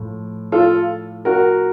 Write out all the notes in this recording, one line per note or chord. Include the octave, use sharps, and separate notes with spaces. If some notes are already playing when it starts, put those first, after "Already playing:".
Already playing: A2 F3
F4 A4
F#4 A#4